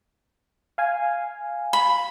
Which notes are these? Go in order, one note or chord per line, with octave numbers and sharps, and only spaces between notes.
F5 G#5
B5